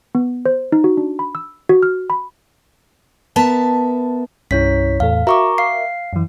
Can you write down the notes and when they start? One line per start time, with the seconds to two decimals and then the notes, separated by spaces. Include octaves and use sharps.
0.15 B3
0.46 C5
0.72 D#4
0.84 F#4
0.97 D4
1.19 B5
1.35 E6
1.69 F#4
1.83 F6
2.10 B5
3.36 B3 A#4 E5 A5
4.51 C2 G2 C#4 E4 C#5 B6
5.00 E2 A2 A4 F5
5.27 F#4 A#4 E5 A#5 C#6 D6
5.58 F5 C7
6.13 F#2 E3